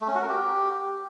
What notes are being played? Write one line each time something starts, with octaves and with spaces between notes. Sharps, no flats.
A3
C#4
F#4
A#4
G4